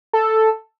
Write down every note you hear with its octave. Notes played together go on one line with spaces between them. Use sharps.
A4